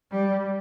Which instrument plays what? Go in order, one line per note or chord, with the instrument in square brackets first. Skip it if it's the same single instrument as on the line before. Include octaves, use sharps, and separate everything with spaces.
[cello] G3